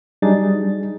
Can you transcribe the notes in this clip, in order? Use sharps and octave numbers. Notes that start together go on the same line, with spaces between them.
F#3 G3 D4 D#4 G#4 A6